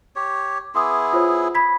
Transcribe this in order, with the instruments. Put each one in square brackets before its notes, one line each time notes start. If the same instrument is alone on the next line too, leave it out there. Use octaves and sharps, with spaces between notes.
[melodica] G4 C#5
[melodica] B3 E4 G#4 [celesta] C6 D6 D#6
[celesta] F4 C5 C#5
B5 G#6 B6